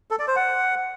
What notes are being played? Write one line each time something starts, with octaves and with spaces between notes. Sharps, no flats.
A4
D5
C5
F#5